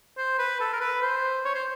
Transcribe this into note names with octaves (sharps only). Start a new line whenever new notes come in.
C5
B4
A4
A#4
B4
C5
C#5
C5